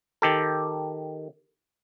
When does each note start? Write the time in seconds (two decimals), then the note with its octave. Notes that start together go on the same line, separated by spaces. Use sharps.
0.22 D#3 G4 A4